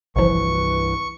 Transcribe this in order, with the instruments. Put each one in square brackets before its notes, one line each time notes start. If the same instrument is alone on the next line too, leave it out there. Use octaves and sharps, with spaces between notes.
[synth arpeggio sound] G1 F3 [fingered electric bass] C2 G2 E3 [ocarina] B4 [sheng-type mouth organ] C#6